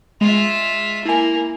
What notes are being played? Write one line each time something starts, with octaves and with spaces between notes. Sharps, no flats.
G#3 F4 E5
A#3 E4 G#5